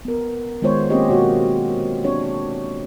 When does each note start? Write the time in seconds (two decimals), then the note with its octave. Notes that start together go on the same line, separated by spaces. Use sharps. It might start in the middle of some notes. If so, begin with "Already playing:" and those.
0.05 B3 A#4
0.62 D#3 G#3 B3 F4 C5 C#5
0.90 A#3 C4 C#4 F4 G4 D#5
1.09 B2 F#4 C#5
2.04 C4 D4 C#5